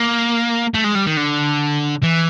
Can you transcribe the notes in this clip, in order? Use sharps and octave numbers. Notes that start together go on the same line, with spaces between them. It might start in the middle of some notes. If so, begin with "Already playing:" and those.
Already playing: A#3
A3
G#3
G3
D#3
D3
E3